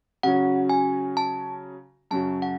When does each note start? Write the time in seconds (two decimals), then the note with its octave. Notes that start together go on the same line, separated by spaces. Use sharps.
0.23 C#3 F#3 C#4 F#4 F#5
0.70 G#5
1.17 A5
2.11 F#2 C#3 F#3 C#4 F#4 A5
2.42 F#5